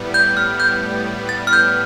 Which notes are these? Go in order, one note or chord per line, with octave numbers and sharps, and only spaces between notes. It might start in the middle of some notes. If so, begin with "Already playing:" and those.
Already playing: A2 G3 B3
G6
F6
G6
A6
F6
G6